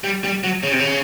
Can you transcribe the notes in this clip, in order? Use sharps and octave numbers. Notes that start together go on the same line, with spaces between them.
G3
G3
F#3
C#3
C3
C#3